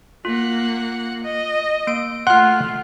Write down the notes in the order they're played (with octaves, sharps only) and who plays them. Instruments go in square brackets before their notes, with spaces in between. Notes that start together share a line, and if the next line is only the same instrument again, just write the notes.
[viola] A#3 F#5 [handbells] F4
[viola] D#5
[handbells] A#3 D7
[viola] A3 F4 [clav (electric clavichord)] F#5 [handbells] C6 F6